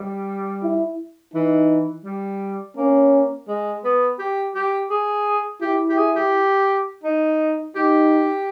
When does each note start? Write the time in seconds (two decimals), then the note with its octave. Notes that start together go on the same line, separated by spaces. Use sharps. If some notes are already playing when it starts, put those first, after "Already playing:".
Already playing: G3
0.63 E4
1.34 E3 D#4
2.05 G3
2.77 A#3 C#4
3.48 G#3
3.84 B3
4.19 G4
4.55 G4
4.90 G#4
5.62 E4 G4
5.89 G4
5.98 G#4
6.16 G4
7.04 D#4
7.76 D#4 G4